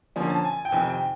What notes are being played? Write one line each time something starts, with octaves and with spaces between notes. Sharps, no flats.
D3 F3 A#3 C#4 G#5
A5
G#5
G5
F2 C3 D#3 G#5
G5